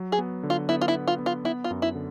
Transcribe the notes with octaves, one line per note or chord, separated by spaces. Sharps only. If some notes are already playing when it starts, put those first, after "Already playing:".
Already playing: F#3
G#4
B3
D3
F4
B3 E4
F4
E4
B3
F4
B3
F4
B3 E4
F4
F#2
E4
D3